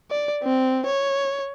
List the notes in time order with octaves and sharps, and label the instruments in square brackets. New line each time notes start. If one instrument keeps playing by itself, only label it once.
[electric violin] D5
C4
C#5